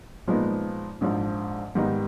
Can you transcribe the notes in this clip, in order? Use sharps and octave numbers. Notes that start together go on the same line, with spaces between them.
A#2 F3 G#3 B3 D#4
A#1 G#2 F3
G#2 D#3 G3 B3 D#4